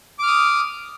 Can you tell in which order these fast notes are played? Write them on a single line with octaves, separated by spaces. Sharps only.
D6 F6 D#6